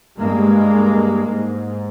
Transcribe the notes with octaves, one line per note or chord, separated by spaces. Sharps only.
G2 G#3 A#3
G#2